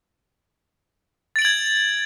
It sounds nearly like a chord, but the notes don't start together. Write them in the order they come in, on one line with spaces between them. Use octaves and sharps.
A6 D7 F#7 G#6